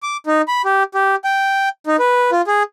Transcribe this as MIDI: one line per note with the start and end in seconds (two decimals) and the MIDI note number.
0.03 0.17 86
0.27 0.42 63
0.48 0.62 83
0.65 0.83 67
0.94 1.15 67
1.24 1.69 79
1.87 1.96 63
1.99 2.31 71
2.32 2.41 65
2.47 2.63 68